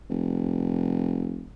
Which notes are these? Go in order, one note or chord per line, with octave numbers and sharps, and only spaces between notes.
F1